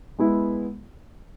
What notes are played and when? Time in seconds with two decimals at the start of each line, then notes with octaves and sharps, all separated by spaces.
0.18 G#3 B3 E4